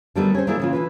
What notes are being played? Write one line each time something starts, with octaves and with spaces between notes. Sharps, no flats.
D3 D#3 G3 A3 B3
C#4 C5
D#3 A#3 C4 E4 G#4 D5
C#3 E3 F4
D3 E3 B4